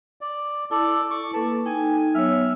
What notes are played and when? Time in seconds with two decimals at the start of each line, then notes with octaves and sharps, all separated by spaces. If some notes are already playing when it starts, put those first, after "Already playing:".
0.21 D5
0.71 E4 A4 D5
1.11 C#6 D6
1.33 A#3 A4 B4 A5
1.66 D#4 G5 G#5
2.15 F#3 B3 C#5 E5 F6